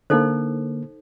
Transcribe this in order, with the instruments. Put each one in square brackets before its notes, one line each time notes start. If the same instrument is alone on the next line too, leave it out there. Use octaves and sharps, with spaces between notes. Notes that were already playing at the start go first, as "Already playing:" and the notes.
[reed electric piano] D3 A#3 [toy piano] D#4 A4 C5